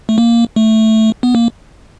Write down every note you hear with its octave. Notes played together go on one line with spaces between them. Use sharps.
A3
A#3
A3
B3
A#3